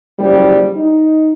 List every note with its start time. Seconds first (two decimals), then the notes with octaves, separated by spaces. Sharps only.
0.19 F#1 D#2 F3 G3
0.76 D#4